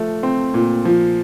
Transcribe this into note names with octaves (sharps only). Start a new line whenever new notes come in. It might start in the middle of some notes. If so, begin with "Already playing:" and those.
Already playing: F3 A3
C4
A#2
F3